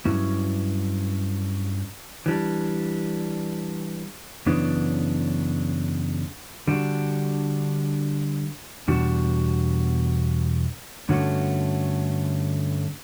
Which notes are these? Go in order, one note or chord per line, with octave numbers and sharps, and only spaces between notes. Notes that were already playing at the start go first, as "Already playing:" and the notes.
G2 F#3 C#4 E4
E3 G3 D4
F#2 C#3 E3 B3 D4
D3 G3 D4 F#4
E2 B2 G3 D4 F#4
G2 D3 A3 C#4 F#4